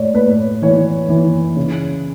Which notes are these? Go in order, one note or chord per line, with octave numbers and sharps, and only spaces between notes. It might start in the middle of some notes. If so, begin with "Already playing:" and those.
Already playing: A2 C#5 D5
A2 B4
E3 C#5
E3
C#3